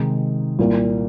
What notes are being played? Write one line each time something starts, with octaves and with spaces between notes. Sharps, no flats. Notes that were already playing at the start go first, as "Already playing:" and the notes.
Already playing: C3 D#3 G#3 D#4
C2 A#2 A#3